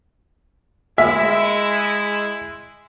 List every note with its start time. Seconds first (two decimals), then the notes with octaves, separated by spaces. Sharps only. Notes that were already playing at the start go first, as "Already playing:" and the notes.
0.98 G#3 E4 E5